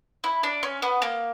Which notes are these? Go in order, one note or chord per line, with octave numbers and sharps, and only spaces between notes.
E4
D4
C#4
B3
A#3